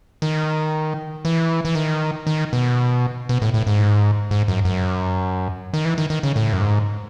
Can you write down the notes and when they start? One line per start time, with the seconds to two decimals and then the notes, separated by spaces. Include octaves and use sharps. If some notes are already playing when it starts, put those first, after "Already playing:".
0.22 D#3
1.25 E3
1.65 E3
1.75 D#3
2.27 D#3
2.53 B2
3.29 B2
3.42 A2
3.54 A2
3.67 G#2
4.31 G#2
4.48 F#2
4.65 F#2
5.74 D#3
5.85 E3
5.98 D#3
6.10 D#3
6.23 C#3
6.36 A2
6.53 F#2
6.61 G#2